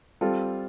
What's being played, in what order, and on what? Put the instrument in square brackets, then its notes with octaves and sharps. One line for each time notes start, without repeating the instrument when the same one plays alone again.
[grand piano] G3 C4 F4 A4